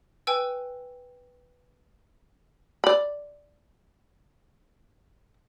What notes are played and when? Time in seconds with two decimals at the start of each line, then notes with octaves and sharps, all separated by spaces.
0.27 B4 G5 G#5 E6
2.84 D5 B5